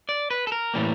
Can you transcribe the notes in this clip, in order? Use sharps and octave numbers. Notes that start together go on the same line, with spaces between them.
D5
B4
A4
A#4
A2 E3 G3 A#3